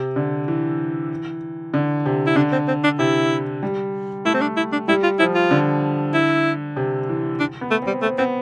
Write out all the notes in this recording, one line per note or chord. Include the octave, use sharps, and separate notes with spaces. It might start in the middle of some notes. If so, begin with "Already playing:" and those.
Already playing: C3
D3
E3
D3
C3
E4
D3 D4
C4
C4
D4
C3 E4
G3
A3 E4
C4
D4
E4
D4
G3 E4
F4
F3 E4
F4
D3
E4
C3
E3
D4
B3
A3
G3 C4
A3 C4
B3 C4